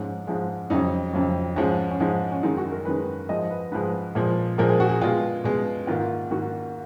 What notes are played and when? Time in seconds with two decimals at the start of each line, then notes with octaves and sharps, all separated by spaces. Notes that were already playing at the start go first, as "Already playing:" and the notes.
Already playing: G#2 F3 G#3 C#4
0.27 G#2 F3 G#3
0.70 F2 C#3 F#3 D#4
1.13 F2 C#3 F#3
1.56 G#2 F3 G#3 C#4
1.91 C#4
2.00 G#2 F3 G#3 D#4
2.32 C#4
2.43 F#2 D#3 G#3 D#4
2.57 F#4
2.72 A#4
2.85 F#2 D#3 G#3 B4
3.29 G#2 F3 G#3 D#5
3.50 B4
3.72 G#2 F3 G#3 B4
4.15 A#2 F3 G#3
4.58 A#2 F3 G#3 A#4
4.69 G#4
4.80 F#4
4.90 G#4
5.02 B2 G#3 F4
5.44 B2 G#3
5.87 G#2 D#3 A#3 F4
6.31 G#2 D#3 A#3 F#4